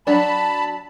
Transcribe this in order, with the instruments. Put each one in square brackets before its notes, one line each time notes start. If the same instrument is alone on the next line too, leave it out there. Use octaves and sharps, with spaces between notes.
[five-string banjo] F#3 D4 [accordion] A5 B5